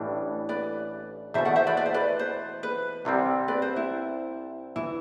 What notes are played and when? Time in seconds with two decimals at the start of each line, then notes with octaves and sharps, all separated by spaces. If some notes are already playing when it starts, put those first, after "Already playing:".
Already playing: A1 A2 E3 G3 D4
0.49 B4 D5
1.34 E2 B2 A3 C5 E5
1.45 D5 F#5
1.56 C5 E5
1.67 B4 D5
1.77 D5
1.86 C5
1.94 B4 D5
2.19 C5
2.63 B4
3.05 C2 C3 G3 C4
3.48 B4 D5
3.62 C5
3.76 E4
4.76 E3 E4